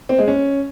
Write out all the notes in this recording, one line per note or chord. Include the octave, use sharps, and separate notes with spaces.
C4
G#3
C#4